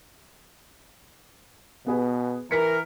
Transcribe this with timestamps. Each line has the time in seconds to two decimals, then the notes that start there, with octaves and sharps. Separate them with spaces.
1.86 B2 B3 G#4 B4
2.51 E3 A#4 B6 C#7